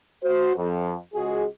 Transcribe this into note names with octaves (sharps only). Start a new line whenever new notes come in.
F#4 C5
F2
C#2 G#3 F#4 G#4